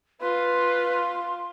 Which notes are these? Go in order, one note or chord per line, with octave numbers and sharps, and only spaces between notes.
F4 B4 C6